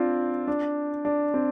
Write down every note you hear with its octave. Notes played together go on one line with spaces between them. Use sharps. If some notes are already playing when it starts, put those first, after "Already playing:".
Already playing: C4 D4 F4
D4
D4
C4